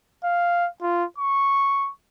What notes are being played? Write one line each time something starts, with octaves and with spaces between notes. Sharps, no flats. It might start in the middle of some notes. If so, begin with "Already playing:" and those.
F5
F4
C#6